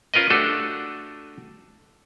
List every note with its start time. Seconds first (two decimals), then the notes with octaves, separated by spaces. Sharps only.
0.14 C#4 F4 A#4 B4 D#5
0.30 A3 D4 F#4 G4 A4